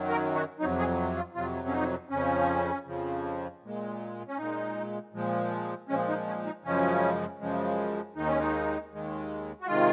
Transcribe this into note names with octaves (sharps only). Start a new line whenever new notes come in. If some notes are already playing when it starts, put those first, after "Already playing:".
Already playing: F#2 D#3 F#3
A#4
F#4
F2 C3 F#3 D#4
G#4
F4
F2 C3 F#3 F4
C#4
D#4
F2 C#3 F3 C#4
F2 C#3 F3
A#2 G#3
C#4
A#2 G#3 D#4
A#2 F3 G#3
A#2 F3 G#3 C#4
D#4
C#4
D#4
F#2 C#3 F3 G#3 C#4
F#2 C#3 F3 G#3
D#2 D#3 G#3 D#4
C#4
D#4
D#2 D#3 G#3
F#4
C3 D#3 G#3 F4